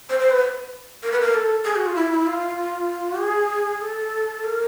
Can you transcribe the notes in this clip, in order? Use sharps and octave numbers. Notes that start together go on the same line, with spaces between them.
C5
C5
B4
A#4
B4
A#4
A4
G#4
F#4
F4
E4
E4
F4
G#4
A4
A#4